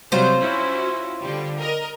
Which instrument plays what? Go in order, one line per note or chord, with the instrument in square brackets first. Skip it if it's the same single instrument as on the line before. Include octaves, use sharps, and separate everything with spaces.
[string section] C3 F#3 G3 [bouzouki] F4 C5
[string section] C#4 E4 F#4
D3 G3
A#4 D#5